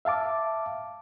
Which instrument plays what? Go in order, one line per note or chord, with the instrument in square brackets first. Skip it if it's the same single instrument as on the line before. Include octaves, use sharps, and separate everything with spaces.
[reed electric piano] E5 F5 A5 D6